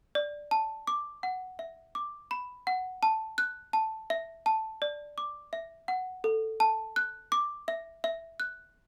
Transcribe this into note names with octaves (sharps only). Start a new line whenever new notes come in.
D5
A5
D6
F#5
E5
D6
B5
F#5
A5
F#6
A5
E5
A5
D5
D6
E5
F#5
A4
A5
F#6
D6
E5
E5
F#6